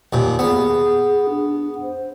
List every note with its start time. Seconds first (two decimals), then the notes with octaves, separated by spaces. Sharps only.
0.13 D#2 A#2
0.39 B3 G#4
1.30 D4
1.82 C5